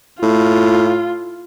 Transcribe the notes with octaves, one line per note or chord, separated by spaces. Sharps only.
A2 F4